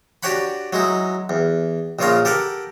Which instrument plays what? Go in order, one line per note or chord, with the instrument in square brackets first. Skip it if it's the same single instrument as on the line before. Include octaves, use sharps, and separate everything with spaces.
[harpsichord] D4 F#4 G4 C#5 F#5 B5
F#3 G#3 D#4 E4
E2
A#1 A#2 C#3 F4 C#5 A#5
G4 A4 A#4 F#5